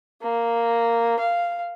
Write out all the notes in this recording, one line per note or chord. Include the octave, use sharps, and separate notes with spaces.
A#3
F5